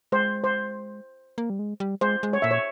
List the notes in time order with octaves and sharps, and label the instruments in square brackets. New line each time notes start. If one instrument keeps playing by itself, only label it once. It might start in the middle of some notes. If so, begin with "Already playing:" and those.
[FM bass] G#3 [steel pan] C5
[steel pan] C5
[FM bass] A#3
G3
G#3
G3
[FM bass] G#3 [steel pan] C5
[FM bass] G#3
[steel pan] C#5
[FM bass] A#2 [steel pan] E5
[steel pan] C#5